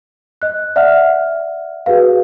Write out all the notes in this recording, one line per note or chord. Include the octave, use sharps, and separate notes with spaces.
D#5 F#6
D5 E5 F#5 F6
F#4 G#4 B4 F5